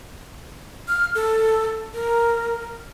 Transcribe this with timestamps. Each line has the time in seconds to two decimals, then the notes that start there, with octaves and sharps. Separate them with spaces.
0.88 F6
1.15 A4
1.94 A#4